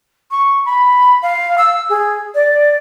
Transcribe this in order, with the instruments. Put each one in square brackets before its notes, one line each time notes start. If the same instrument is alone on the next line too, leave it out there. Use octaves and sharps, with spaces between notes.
[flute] C#6
B5
F5
E6
G#4
D5